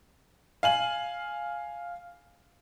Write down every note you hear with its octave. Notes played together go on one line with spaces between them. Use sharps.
F5 G#5 F#7